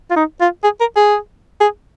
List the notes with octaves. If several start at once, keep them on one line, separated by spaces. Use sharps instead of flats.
F4
D#4
F4
G#4
A#4
G#4
G#4